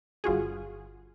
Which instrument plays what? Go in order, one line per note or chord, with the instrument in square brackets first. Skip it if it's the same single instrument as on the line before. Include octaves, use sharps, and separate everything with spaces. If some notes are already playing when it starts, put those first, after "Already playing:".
[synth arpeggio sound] G1 F4 F#4 G#4